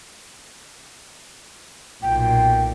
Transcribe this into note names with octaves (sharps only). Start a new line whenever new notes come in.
B1 A#2 G5